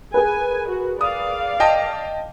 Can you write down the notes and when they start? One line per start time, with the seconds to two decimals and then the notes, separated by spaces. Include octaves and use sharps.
0.14 G#4 A#4 B4 G#5
0.68 F#4
1.01 D5 F5 D#6
1.60 D#5 G5 A5